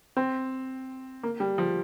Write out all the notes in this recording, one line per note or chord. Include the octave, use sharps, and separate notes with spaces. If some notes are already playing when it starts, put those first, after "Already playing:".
C4
A#3
G3
F3